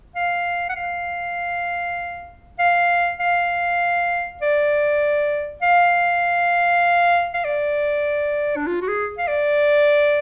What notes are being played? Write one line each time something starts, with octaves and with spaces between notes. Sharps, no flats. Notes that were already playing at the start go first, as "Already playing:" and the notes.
F5
F#5
F5
F5
F5
D5
F5
F5
D5
D4
F4
F#4
G#4
F5
D5